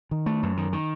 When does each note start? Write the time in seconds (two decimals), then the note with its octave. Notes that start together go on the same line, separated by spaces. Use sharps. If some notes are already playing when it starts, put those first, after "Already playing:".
0.11 D#3
0.26 A3
0.43 F#2
0.57 D#3
0.73 D#3